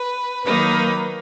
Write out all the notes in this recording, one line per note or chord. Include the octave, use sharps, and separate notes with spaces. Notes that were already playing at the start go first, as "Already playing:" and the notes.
Already playing: B4
D#3 F#3 A#3 D#4 B4